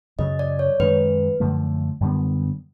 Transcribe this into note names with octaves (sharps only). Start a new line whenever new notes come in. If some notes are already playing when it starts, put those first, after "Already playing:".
F#2 C#3 F#3 D#5
D5
C#5
F#2 D#3 G#3 B4
F#2 D3 F3 A3
F#2 D3 G3 B3